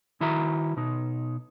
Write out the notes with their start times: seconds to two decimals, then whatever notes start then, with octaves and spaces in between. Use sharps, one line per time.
0.21 D#3 E4 F#4 E5 A#5
0.77 B2 D#4